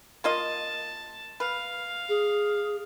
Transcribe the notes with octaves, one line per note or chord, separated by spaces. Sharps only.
A#3 F4 D#5 A5
B4 F5
G#4